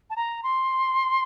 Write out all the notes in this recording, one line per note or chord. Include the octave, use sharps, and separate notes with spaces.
A5
A#5
C6